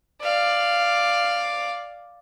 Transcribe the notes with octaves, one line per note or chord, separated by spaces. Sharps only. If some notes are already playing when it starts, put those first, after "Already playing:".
D5 F5